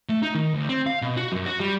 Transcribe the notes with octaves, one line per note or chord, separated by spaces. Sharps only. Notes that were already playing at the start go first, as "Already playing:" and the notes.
A3
D#4
D#3
D2
C4
F5
B2
F#4
F#2
F#4
G3